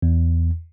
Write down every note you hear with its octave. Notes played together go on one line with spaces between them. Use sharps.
E2